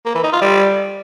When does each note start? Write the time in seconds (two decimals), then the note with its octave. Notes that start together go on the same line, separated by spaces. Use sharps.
0.06 A#3
0.15 E3
0.24 D#4
0.33 F4
0.42 G3